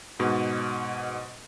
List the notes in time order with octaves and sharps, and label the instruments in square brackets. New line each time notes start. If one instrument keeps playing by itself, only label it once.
[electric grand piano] G#2 B2